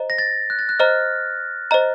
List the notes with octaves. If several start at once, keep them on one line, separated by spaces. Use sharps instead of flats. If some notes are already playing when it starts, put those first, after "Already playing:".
Already playing: C5 D#5 A#5
A#6
A6
F#6
A6
F#6
C5 D#5 A#5 F6
C5 D#5 A#5